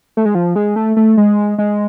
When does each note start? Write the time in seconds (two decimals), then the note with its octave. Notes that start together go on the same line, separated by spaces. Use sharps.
0.17 A3
0.25 G#3
0.35 F3
0.56 G#3
0.76 A3
0.97 A3
1.17 G#3
1.58 G#3